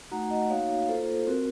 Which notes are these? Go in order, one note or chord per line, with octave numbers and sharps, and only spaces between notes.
A3 D#4 F#4 F#5 A#5
D#5 F#5
A#3 D#4 F#4 C#5 F5
A#3 F4 A4 C5
C4 F#4 A#4